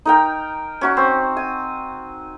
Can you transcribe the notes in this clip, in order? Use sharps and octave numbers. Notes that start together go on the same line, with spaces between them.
D#4 A#4 G5
C#4 F#4 C#6
C4
G#5